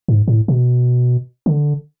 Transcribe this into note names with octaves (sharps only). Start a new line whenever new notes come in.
G#2
A2
B2
D3